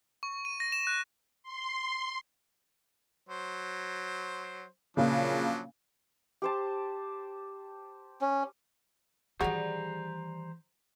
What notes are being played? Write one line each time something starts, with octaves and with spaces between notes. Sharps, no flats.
C#6
D#7
A#6
E7
F#6
C6
F#3 C5
A#2 C#3 F3 F#3 D4
G4 C5 A5
C#4
D#3 E3 G3 F#4 G#4 C5 A#5